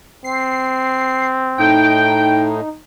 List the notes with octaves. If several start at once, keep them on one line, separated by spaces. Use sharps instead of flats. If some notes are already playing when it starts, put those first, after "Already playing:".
C4 C7
A2 D#4 G5